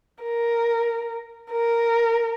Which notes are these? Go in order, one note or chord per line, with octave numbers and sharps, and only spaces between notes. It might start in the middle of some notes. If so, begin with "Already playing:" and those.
A#4
A#4